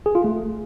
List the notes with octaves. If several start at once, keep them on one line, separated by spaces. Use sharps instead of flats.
G#4
F4
A3